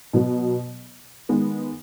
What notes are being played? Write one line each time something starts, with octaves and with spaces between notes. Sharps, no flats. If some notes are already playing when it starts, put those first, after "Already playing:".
B2 F#3 B3
D#3 G#3 B3